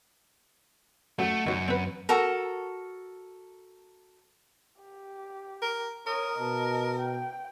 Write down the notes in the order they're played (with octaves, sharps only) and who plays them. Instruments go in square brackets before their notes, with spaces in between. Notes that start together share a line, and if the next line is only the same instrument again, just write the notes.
[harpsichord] F#2 [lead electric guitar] A3 [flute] F#5
[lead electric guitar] F#2 [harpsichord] D#3 F#3
[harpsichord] C4 B4
[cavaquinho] F#4 A4 A#4
[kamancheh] G4
[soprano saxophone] A#4
[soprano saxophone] A#4 [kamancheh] C#5 D#6
[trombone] B2 [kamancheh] D#5 A5
[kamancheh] G5